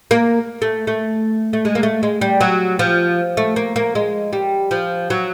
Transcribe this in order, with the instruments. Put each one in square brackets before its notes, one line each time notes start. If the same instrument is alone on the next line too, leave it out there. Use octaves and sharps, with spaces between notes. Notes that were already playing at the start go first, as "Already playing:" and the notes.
[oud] A#3
A3
A3
A3
G#3
A#3
A3
G#3
G3
F#3
F3
A3
A#3
A#3
G#3
G3
F3
F#3